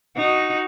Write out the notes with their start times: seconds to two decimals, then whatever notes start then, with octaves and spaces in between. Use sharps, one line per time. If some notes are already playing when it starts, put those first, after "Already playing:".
0.17 D#4 F#4